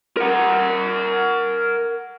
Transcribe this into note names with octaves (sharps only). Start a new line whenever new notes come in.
A#4 F#5